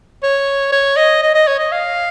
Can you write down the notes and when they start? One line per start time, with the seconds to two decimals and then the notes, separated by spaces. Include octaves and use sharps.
0.23 C#5
0.72 C#5
0.96 D#5
1.22 D#5
1.34 D#5
1.47 C#5
1.59 D#5
1.72 F5